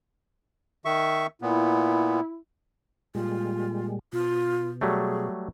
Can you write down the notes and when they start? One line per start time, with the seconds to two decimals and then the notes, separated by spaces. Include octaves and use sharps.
0.85 D#3 E5 C#6
1.42 A#2 B3 E4
3.15 A#2 G3 G#3 F4
4.13 B2 F4
4.81 F#3 G3 A3 G#4